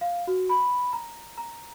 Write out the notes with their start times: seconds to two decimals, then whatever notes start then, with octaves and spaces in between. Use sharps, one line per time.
0.01 F5
0.27 F#4
0.49 B5
0.93 A#5
1.38 A#5